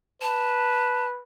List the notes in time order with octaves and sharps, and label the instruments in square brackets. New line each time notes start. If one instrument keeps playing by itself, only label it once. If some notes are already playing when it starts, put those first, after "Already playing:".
[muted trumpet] B4 [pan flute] A5